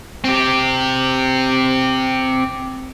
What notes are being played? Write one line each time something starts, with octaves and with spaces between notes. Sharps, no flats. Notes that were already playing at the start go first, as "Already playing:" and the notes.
C4 G4